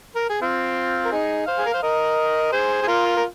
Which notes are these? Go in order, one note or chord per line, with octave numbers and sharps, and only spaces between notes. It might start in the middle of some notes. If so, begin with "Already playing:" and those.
A#4
G#4
C4 F4
A#4
D#4 G#4
C5 F5
G#4
A#4
C5
A#4 D#5
G#4 C5
G#4
F4 A#4
A#4